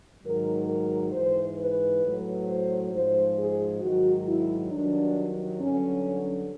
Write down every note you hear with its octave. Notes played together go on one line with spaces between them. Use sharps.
G#2 D#3 F#3 A#4
A#4
G#2 E3 C5
B4
A2 F#3
C5
G#2 F3 C5
G#4
G#2 D#3 F#3 F#4
E4
G2 D#3 F#3 D4
G2 D3 F#3 C#4